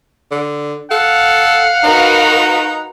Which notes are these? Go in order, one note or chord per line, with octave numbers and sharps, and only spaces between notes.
D3
A4 F5 F#5
D#4 F#4 A#4 B4